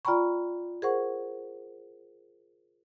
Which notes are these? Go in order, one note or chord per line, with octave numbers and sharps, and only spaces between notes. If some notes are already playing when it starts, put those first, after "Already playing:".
F4 D5 G5 A#5 B5 C#6
G#4 A#4 C5 F#5 C#6